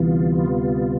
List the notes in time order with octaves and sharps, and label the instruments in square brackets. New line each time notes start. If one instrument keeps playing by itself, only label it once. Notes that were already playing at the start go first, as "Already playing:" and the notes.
Already playing: [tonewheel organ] D2 C3 G3 B3 F4 [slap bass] E3